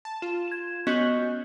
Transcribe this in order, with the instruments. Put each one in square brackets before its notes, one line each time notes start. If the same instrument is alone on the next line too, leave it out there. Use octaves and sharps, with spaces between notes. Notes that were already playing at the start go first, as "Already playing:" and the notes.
[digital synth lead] A5
[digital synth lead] F4 [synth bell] E7
[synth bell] G#6 E7
[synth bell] B3 F#4 G6 [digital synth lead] C#4 [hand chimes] D#5 C#6